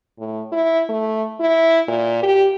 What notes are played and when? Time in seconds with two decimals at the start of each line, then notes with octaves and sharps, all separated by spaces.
0.19 A2
0.52 E4
0.89 A3
1.40 E4
1.88 A#2
2.23 G4